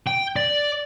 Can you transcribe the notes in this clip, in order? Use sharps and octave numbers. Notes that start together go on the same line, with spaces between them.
G5
D5